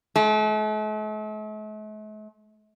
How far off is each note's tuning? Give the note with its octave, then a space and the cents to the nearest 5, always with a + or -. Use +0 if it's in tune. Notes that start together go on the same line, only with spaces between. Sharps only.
A3 -45